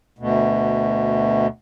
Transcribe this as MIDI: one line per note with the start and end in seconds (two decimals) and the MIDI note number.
0.19 1.47 38
0.19 1.47 47